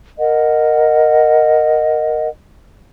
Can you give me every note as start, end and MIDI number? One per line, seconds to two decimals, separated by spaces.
0.19 2.28 70
0.19 2.28 75
0.19 2.28 78